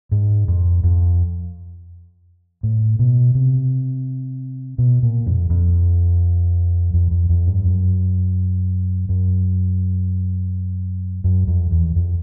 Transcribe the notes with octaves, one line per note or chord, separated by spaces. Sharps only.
G#2
F2
F2
A2
B2
C3
B2
A#2
F2
F2
F2
F2
F2
G2
F#2
F#2
F#2
F2
E2
F2